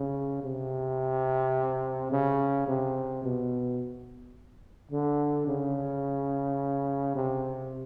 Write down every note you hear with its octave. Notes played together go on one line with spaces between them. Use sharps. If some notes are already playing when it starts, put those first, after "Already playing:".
Already playing: C#3
C3
C#3
C3
B2
D3
C#3
C3